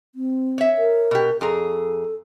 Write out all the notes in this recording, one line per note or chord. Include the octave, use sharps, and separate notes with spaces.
C4
C#5 E5
A#4
B2 G4
F2 G#4 A4 A#5